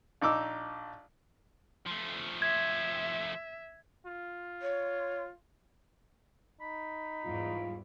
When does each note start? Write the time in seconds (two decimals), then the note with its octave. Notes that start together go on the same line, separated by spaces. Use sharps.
0.21 A#1 D#4 D6 E6
1.86 F3 A3
2.42 E5 G#6
4.06 F4
4.62 C#5
6.61 D#4 B5
7.25 E2 G#2 G3 F4